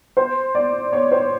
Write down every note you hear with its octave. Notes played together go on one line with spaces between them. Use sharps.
C5
D5
C#5
C5